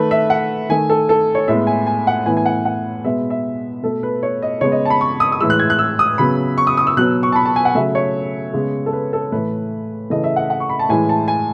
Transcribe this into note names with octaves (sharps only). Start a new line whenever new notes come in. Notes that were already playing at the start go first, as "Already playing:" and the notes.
Already playing: D#3 A3 B4
E5
F#5
D#3 A3 G#5
A4
A4
C#5
A2 G#3 B3 E5
G#5
G#5
F#5
A2 E3 B3 G#5
G#5
F#5
F#5
B2 G#3 B3 E5
E5
B2 A3 A4
B4
C#5
D#5
C#3 G#3 B3 C#5
D#5
A5
B5
C#6
D#6
D#6
A2 E3 G#3 E6
F#6
G#6
F#6
E6
D#6
C#3 F#3 B3 B5
C#6
D#6
D#6
E6
B2 F#3 B3 F#6
C#6
A5
B5
A5
G#5
F#5
C#3 F#3 A3 E5
C#5
C#3 G#3 B3
A4
B4
A4
A2 E3 A3 B4
C#3 E3 A3 D#5
E5
F#5
F#5
C#6
B5
A5
A2 E3 G#3 G#5
A5
G#5